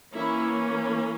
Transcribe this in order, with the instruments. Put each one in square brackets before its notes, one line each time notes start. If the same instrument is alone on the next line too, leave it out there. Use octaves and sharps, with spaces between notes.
[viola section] E3 A#3 C#4 E4